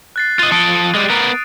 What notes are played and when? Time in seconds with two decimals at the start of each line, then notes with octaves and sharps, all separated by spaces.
0.16 F#6 A6 C7
0.39 F4 D#5 A6 D#7
0.52 F3 A4 D#6 D7
0.95 G3 G#3
1.10 B3 A#4